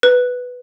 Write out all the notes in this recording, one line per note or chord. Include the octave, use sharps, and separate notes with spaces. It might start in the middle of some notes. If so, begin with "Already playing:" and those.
B4